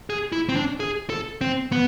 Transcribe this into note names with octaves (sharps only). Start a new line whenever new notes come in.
G#4
E4
C4
D4
G#4
A4
C4
B3